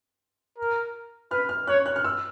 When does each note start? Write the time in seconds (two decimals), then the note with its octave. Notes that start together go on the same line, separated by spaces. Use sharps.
0.58 A#4
1.31 B4 F6
1.49 F6
1.67 C#5 F#6
1.86 F#6
1.96 F6
2.04 E6